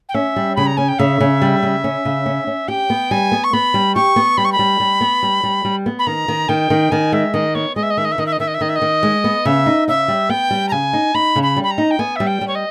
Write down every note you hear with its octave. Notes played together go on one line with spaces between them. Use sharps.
G5
C#4 E5
G3
C#3 B5
A#5
C#4 G#5
G5
C#3 E5
C#3
G3
C#3
C#4
C#3
C#4
C#4
G4 G5
B3
G3 G#5
B3
C#6
B3 B5
G3
G4 C#6
B3
G3 B5
C#6
B5
G3
G3
B3
G3
G3
G3
B3
B5
D#3 A#5
D#3
D#3 G5
D#3
D#3 G#5
G#3 E5
D#3 D#5
B3 C#5
G#3 D#5
E5
D#5
D#3 E5
D#5
E5
D#3 D#5
E5
D#5
D#3 E5
D#5
E5
D#3 D#5
E5
D#5
D#3
G#3
B3
C#3 E5
D#4
C#3 E5
G3
B3 G5
G3
A#5
C#3 G#5
D#4
D#4 B5
C#3
B5
G3
B5
A#5
D#4
G5
B3 G#5
G3 E5
G5
G3
C#5
D#5